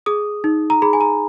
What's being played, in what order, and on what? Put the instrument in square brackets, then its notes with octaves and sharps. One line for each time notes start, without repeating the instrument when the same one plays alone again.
[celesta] G#4 D#6
D#4
A#5
G#4 B5
G#5
A#5